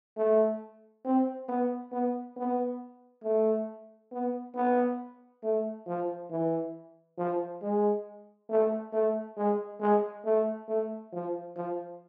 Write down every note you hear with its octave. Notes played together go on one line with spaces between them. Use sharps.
A3
C4
B3
B3
B3
A3
B3
B3
A3
F3
E3
F3
G#3
A3
A3
G#3
G#3
A3
A3
F3
F3